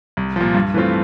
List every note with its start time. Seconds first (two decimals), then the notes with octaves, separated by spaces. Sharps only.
0.17 C2
0.36 A#2 F3
0.55 G2
0.74 E3 A3 C4 F4